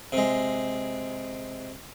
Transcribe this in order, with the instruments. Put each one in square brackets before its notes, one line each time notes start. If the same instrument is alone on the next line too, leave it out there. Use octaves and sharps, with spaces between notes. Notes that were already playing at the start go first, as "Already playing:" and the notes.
[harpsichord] C3 G#3